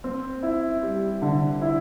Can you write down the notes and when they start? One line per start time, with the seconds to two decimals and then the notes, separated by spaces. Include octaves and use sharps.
0.04 C4
0.43 E4
0.83 G3
1.22 D3
1.62 E4